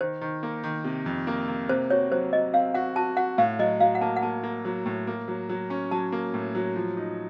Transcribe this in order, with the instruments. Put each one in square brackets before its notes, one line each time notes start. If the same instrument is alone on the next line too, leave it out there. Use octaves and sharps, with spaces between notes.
[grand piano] D#3 [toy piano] C5
[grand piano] D#3
A#3
D#3
C3
F2
A#3
A#3
[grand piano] C3 [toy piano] C5
[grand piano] F#4 [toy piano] C#5
[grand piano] F#3 [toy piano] C5
[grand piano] F#3 [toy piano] D#5
[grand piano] C4 [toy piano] F5
[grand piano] F#4 [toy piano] F#5
[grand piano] F#4 [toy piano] A5
[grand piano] F#4 [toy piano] F#5
[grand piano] A2 [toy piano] F5
[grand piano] F#3 [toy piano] D#5
[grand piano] F#3 [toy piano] F5
[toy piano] F#5
[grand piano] A#3 [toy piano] A5
[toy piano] F#5
[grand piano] A#3 [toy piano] A5
[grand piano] A#3
F#3
A2
A#3
F#3
F#3
C#4
[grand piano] F#3 [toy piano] A5
[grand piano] A#3
A2
F#3
F3
D#4